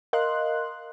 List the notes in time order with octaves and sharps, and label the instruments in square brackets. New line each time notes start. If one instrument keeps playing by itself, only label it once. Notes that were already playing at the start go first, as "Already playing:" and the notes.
[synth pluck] A#4 D#5 F5 C6 F#6